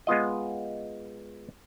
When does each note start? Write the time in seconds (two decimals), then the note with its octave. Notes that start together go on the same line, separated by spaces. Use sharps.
0.07 G#3 B3 F4 D#5